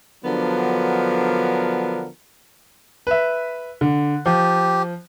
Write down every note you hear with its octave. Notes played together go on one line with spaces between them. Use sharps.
D3 F3 F#3 B3 D4 A#4
B4 E5
D3
F3 G4